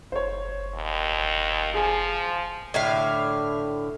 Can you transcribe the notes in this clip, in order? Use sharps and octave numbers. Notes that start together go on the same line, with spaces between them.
F#1 C5 C#5
D#2
F3 G#4 G#5
A2 D3 E5 F5